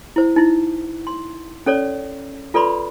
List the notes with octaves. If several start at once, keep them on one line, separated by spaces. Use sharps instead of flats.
E4 C5
D#4 E4
C6
C#4 A4 C#5 D5
F4 A4 B4 D5 B5 C6